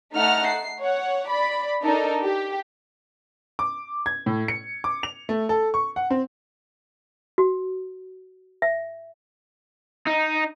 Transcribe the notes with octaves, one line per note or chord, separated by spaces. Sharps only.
A3 D#4 F#5 A5 F6
C7
C#5 F#5
D5 B5
D4 D#4 A4 A#4
G4
D6
G#6
A2
C#7
D6
F7
A3
A4
C#6
F#5
C4
F#4
E5
D#4